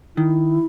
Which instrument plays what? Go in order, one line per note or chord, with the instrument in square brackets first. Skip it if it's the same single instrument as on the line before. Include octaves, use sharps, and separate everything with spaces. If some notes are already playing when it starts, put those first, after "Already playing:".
[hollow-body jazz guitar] D#3 [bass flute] E4